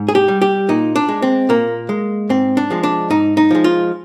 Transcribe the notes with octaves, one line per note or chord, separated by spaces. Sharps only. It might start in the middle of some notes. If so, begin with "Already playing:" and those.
Already playing: G#2
G#4
G4
G3
G4
A#2 D#4
D4
G#3
C4
A#2 A#3
G#3
G#2 C4
D4
F3 G#3
D4
G#2 D#4
D#4
F3 G#3
F4